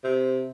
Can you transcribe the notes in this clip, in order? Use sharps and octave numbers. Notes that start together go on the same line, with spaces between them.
C3